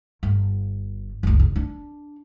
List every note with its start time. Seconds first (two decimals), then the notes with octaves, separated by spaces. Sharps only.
0.23 G1
1.23 F#1 C#2
1.40 D3
1.56 D4